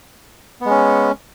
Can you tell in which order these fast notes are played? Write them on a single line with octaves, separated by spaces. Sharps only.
B3 G#3 C#4